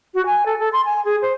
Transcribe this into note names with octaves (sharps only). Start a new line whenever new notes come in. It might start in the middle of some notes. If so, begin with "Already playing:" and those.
F#4
G#5
A4
A4
C6
G#5
G#4
C5